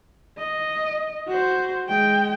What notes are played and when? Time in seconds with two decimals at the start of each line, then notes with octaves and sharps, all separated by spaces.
0.39 D#5
1.28 F#4 C5
1.87 G#3 G5